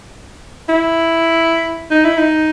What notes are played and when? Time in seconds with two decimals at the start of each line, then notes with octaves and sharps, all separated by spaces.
0.69 E4
1.91 D#4
2.04 E4
2.18 D#4